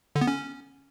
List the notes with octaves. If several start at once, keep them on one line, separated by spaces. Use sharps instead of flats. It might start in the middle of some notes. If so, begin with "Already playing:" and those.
D3
B3
C#4